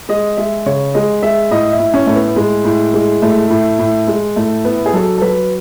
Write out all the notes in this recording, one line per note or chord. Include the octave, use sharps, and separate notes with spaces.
G#3 D#5
G#3 E5
C#3 C#5
G#3 D#5
G#3 E5
A2 D#5
E4
A2
C#4
A2 A3
B3
A2 G#3
A2
G#3
A2 A3
A2
A2
G#3
A2 A3
A2 B3
G#4
F#3 A4
A4
F#3 B4